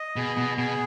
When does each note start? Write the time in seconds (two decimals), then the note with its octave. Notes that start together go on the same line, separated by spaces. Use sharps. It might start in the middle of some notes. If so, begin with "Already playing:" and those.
Already playing: D#5
0.16 B2 G#4
0.37 B2
0.58 B2 G#4